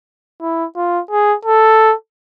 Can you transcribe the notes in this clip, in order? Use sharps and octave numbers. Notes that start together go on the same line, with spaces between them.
E4
F4
G#4
A4